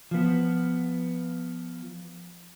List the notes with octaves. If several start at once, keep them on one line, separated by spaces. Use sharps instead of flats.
F3 B3